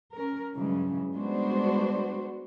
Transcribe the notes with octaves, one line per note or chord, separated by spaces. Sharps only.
C#4 A#4
G2 C#3 E3 F#3 G#3
G3 G#3 B3 D4 F#4 C5